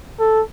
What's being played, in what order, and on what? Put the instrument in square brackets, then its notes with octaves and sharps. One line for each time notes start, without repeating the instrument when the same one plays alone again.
[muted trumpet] A4